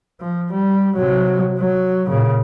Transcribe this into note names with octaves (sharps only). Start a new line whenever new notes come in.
F3
G3
C3 F#3
F#3
A#2 C#3